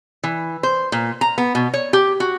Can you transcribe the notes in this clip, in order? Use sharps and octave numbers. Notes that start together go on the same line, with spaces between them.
E3
C5
A#2
A#5
B3
B2
C#5
G4
F#4